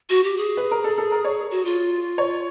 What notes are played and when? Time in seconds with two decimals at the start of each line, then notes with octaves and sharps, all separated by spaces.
0.10 F#4
0.24 G4
0.37 G#4
0.57 B4
0.71 A#4
0.84 A4
0.98 A4
1.12 A#4
1.25 C#5
1.51 F#4
1.65 F4
2.18 C#5